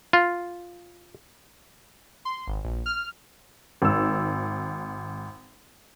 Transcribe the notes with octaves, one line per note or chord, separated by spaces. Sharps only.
F4
C6
G#1
A#1
F6
G#1 E6